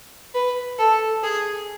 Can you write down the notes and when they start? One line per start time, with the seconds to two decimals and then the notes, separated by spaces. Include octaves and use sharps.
0.34 B4
0.78 A4
1.22 G#4